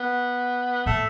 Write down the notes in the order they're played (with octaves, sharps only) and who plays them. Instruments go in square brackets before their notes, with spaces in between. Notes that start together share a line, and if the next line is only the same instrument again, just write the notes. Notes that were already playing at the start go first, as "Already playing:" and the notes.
Already playing: [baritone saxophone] B3
[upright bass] A2 [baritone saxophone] A3